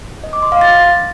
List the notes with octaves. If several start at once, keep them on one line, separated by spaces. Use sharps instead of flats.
D#5
D6
C6
F5
A6